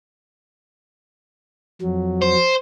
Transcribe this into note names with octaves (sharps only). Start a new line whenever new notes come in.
F2 F#3
C5